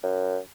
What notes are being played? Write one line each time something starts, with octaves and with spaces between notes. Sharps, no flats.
F#2